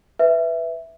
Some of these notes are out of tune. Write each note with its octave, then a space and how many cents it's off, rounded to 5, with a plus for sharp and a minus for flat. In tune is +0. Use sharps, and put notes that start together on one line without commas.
B4 +5 E5 +0